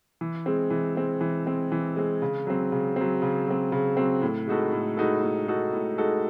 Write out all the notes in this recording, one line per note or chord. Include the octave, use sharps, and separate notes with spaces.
E3
G#3 C4
E3
G#3 C4
E3
G#3 C4
E3
G#3 C4
C#3
F#3 C4
C#3
F#3 C4
C#3
F#3 C4
C#3
F#3 C4
A2
G#3 D#4 F#4 A4
A2
G#3 D#4 F#4 A4
A2
G#3 D#4 F#4 A4
A2
G#3 D#4 F#4 A4